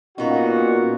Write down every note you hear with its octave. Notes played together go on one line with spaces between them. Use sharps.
A#2 B3 C#4 D#4 F#4 F5